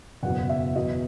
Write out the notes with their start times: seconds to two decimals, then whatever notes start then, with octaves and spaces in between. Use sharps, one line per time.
0.23 F#1 E2 B2 F#5
0.49 E5
0.75 E2 B2 F#3 D#5